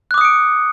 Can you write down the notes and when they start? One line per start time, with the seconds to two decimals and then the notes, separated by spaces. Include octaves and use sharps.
0.11 F#6
0.14 D6
0.18 D#6
0.21 C#7
0.25 D7